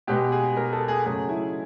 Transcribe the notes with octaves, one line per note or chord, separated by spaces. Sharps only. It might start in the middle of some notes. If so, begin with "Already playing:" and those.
B2 G#3 B3 G4
G#4
A#4
A4
G#4
C#3 F#3 A3 G#4
E4